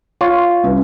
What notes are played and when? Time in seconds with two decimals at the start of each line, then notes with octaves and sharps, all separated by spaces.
0.21 F4 C#5
0.63 C2 C#4 B4